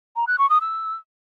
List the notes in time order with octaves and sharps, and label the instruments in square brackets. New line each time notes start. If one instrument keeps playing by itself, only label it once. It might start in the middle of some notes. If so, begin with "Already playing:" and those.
[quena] A#5
F#6
C#6
D#6
E6